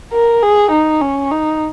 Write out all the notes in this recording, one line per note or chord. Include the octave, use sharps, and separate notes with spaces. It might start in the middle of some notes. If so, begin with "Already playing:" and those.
A#4
G#4
D#4
C#4
D#4